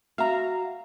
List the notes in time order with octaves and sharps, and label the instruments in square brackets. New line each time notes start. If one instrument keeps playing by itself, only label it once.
[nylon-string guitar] F#4 E5 [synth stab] F5 A#5